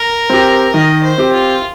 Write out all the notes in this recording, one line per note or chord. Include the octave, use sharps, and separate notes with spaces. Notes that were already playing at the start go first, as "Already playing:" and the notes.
Already playing: A#4
C4 G4
D#3 D#5
C5
C4 G4
F4